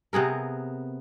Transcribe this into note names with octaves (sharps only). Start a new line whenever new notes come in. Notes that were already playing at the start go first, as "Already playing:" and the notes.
C3 B3 G#4 A#4